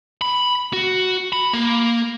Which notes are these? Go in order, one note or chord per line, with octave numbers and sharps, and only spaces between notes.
B5
F#4
B5
A#3